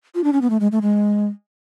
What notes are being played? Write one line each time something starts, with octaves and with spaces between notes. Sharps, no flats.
F4
D4
C#4
B3
A3
G#3
A3
G#3